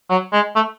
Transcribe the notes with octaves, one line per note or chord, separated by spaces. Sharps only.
F#3
G#3
A3